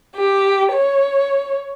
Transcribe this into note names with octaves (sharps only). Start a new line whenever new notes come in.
G4
C#5